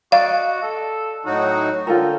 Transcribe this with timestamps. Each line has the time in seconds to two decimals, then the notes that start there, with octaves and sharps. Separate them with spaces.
0.12 F#4 D5 D#5 F5
0.62 A4
1.26 A2 F#3 D#4 F#4
1.87 D3 F4 A4 A#4 G5